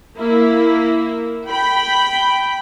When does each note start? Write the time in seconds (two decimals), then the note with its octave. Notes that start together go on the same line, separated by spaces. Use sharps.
0.18 A#3 E4
1.48 G5 B5